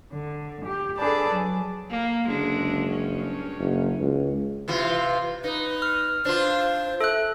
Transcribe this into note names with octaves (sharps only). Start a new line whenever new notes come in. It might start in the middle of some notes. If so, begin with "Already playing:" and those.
D3
G4
D4 G#4 A4 B4 D5 A5
F#3
A#3
F#1 D3 G#3 D4
G2 C#4
F#1
C#2
C3 E3 F4
D#4 B4
F6
D4 F4 C5
A4 E5 F#6